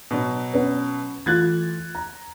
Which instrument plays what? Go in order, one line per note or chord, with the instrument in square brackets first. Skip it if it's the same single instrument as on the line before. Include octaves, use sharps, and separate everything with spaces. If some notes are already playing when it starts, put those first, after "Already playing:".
[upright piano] B2 F#3
[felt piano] B3 C#4 B4
[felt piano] E3 A3 F4 [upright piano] F#6 G#6 A6
[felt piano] A#5